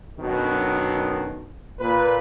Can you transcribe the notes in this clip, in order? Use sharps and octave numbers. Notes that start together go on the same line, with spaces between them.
F#2 B2 D3 D#3 F#3
A#2 B4